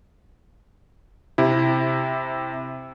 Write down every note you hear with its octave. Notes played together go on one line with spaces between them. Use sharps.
C3 E4